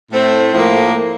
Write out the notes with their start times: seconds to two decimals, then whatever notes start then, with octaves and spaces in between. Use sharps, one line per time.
0.11 A2 A3 C4
0.52 A2 F3 A#3